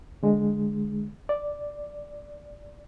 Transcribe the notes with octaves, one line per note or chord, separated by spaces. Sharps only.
D3 G#3
D5